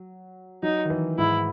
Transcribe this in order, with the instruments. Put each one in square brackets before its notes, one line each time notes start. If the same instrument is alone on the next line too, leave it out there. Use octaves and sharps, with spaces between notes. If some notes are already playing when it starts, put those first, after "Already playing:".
Already playing: [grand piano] F#3
[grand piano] F#3 [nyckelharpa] D#4
[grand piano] D#3
E3
[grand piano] G#2 [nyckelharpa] E4